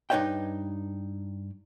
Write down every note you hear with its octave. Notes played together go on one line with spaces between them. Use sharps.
G2 D#4 B4 C#5 E5 G5